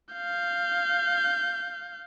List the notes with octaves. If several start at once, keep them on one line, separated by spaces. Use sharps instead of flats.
F5 G6